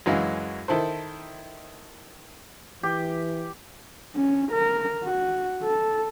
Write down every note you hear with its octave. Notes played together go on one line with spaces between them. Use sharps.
F#2 E3 G#3 F#4 F5
D#3 E4 A4 C5
E3 G4
C#4
A#4
F#4
A4